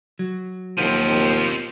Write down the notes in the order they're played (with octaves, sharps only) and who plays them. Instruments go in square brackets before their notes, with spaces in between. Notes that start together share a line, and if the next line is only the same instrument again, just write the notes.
[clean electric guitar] F#3
[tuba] D#2 [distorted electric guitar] B2 C4 [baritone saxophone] F3